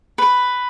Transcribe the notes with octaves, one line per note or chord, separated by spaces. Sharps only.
B4